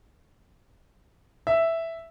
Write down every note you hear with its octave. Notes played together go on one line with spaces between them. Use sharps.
E5